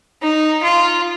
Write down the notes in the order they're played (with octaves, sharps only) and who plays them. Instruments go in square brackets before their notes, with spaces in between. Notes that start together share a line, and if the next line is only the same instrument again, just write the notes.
[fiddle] D#4
F4